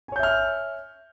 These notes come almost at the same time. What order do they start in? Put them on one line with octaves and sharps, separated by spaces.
G#5 C#5 G6 E5 F6